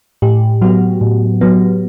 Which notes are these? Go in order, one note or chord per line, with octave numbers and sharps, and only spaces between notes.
A2 G4
F#3 B3 F#4
A2
F#3 B3